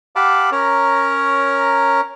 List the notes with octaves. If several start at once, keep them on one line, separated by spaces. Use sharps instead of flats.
G4 F5 F#5 A5 B5 D6
C#4 A#4 C#5 A#5